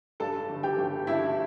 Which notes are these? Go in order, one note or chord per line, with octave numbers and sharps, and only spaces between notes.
G2 A4 A5
G1
G4 G5
G1
G2 E4 E5